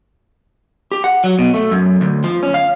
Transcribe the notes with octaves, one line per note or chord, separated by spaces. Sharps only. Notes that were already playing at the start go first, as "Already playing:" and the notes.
G4
F#5
F#3
B2
A3
F#2
D2
F3
C#4
F5